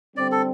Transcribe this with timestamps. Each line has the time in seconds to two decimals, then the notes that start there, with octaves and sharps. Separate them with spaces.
0.16 D3 G3 C4 D5
0.32 A4